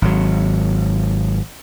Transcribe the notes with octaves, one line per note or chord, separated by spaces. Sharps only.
G#1 F#3